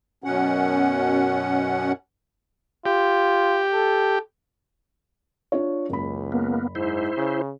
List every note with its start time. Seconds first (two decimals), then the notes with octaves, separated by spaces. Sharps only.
0.24 F#2 B2 C#4 F#5
2.86 F4 G4
3.73 A4
5.52 D4 F4 C#5
5.89 F#1 C#2 B5
6.32 A#3 B3
6.75 G#2 E4 C5
7.17 C#3